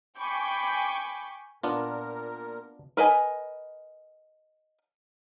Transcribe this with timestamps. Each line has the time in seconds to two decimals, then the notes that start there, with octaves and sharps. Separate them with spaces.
0.18 G5 G#5 B5 C#6 D6 G6
1.63 A#2 B3 D4 F4 A#4
2.97 A#4 B4 D#5 G#5